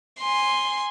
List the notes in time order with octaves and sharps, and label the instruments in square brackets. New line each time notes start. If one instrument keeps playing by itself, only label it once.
[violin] G#5 C6